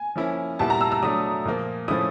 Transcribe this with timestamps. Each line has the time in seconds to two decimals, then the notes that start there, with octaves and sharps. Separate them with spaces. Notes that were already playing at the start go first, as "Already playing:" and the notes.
Already playing: G#5
0.16 F3 A#3 C#4 E4
0.59 A#2 G3 B3 E4 A5
0.70 A#5
0.81 E6
0.92 E6
1.03 F#3 A3 D4 D#6
1.45 A#2 F3 A#3
1.88 A2 F3 A3 C#4 E4 D#6